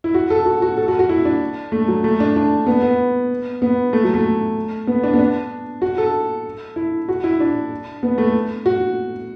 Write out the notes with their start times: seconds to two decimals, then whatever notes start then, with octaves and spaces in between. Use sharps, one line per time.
0.04 E4
0.14 F#4
0.30 A4
0.46 F#4
0.62 F#4
0.78 A4
0.88 F#4
0.99 F#4
1.09 E4
1.25 D4
1.72 A3
1.88 F#3
2.04 A3
2.20 D4
2.36 D4
2.67 B3
2.82 B3
3.62 B3
3.93 A3
4.04 F#3
4.14 A3
4.87 B3
5.03 D4
5.14 B3
5.19 D4
5.82 F#4
5.98 A4
6.76 E4
7.09 F#4
7.24 E4
7.40 D4
8.03 B3
8.18 A3
8.66 F#4